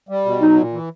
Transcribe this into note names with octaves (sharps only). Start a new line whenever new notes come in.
G3
B2
F#3 D#4
A#2
E3